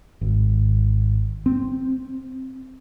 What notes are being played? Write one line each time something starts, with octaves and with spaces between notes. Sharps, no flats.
G#1
C4